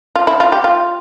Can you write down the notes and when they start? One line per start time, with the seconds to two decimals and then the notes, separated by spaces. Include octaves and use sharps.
0.16 F4
0.27 E4
0.40 F4
0.52 G4
0.64 F4